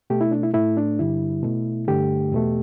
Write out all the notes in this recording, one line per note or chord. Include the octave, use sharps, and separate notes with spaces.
B2 A3 G4
E4
D4
E4
A2 A3 E4
D4
G2 D3 G3 E4
B2 A3
G2 D3 A3 G4
E2 B2 A3